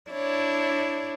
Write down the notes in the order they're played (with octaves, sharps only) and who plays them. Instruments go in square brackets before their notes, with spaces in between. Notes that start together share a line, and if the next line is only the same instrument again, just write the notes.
[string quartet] D4 E4 C#5 D5